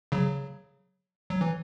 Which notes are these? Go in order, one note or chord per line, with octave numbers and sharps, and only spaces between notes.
C#3 F#3
F#3
E3